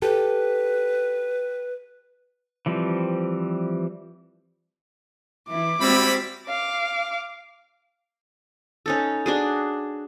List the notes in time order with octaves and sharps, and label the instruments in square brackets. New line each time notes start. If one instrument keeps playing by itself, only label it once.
[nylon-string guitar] G4 A4 [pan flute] B4
[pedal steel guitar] E3 F3 G3 C4
[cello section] E3 E4 [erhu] D6
[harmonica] G3 E4 B5 [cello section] G#3 C4 F#4
[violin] F5 D6
[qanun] C#4 D#4 A4
D4 F#4 G#4